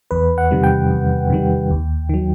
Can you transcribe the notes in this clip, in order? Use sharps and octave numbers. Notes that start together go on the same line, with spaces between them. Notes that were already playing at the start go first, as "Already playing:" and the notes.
E2 B4
F#5
C3 D#3 G3
G5
E2
C3 D#3 G3
D#2
D#3 F#3